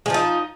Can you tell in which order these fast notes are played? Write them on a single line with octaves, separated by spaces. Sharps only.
G#3 F3 D#4